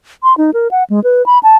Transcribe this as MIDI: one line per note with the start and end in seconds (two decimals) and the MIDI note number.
0.23 0.36 84
0.38 0.51 63
0.54 0.68 70
0.71 0.84 78
0.90 1.02 56
1.04 1.25 71
1.26 1.39 83
1.43 1.56 81